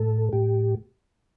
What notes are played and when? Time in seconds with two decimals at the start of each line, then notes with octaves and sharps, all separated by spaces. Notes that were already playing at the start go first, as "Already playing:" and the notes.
Already playing: A2 A4
0.33 A2 G4